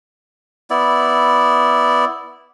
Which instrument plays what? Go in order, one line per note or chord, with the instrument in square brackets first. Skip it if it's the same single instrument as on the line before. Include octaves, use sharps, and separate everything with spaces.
[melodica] B3 E4 D5